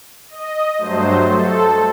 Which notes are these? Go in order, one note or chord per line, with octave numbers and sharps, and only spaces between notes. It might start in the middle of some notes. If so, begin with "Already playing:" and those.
D#5
G2 F#3 A3 C5
A4